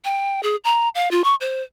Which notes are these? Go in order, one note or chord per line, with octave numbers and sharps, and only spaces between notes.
G5
G#4
A#5
F5
F4
C#6
C5